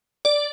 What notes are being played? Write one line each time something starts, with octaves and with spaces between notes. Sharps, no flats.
D5